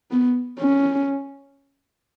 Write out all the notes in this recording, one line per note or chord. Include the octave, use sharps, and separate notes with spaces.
B3
C#4